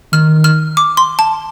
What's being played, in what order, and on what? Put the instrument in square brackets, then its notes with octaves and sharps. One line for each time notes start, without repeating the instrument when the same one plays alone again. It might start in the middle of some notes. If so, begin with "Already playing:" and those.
[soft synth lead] D#3 [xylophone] F6
[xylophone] F6
D6
C6
A5